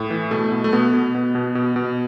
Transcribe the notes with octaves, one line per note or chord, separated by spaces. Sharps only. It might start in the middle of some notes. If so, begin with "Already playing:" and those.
Already playing: A2
E3
B2 A3
B2
A3
B2 B3
B2
B2
B2
B2
B2